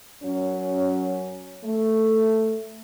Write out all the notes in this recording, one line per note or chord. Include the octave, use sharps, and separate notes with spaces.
F#2 F#3 C#4
A3